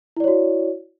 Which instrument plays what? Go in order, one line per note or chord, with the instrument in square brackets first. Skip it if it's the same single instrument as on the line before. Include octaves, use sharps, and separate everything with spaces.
[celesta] E4
D5
C#5
F#4